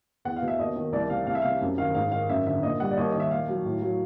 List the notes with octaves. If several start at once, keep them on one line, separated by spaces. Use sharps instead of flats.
E2 F#5
F5
B2
E5
D#2 D#5
D#3
C2 D5
C3 F5
C2 F5
E5
C3 F5
F#2
D#3 F5
G#2 F5
D#3 F5
F#2 E5
D3 E5
A#2 D#5
G3 F#5
D5
D#2 D#5
D#5
D#3
E5
A#2 F5
F#3
A2
F#3